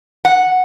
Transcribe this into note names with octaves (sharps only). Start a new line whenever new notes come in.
F#5